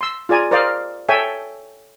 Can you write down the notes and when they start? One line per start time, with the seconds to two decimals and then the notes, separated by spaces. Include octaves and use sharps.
0.01 C6 E6
0.29 F4 G#4 D5 G#5 A#5
0.51 A#4 C5 D5 D#5 F5
1.09 A4 C#5 E5 G5 G#5